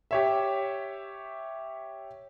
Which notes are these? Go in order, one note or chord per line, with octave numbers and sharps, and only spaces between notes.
G4 C#5 E5